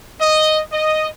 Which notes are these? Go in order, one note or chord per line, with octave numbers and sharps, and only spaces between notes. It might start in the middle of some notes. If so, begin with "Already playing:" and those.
D#5
D#5